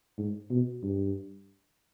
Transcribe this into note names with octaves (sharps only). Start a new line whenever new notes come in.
G#2
B2
G2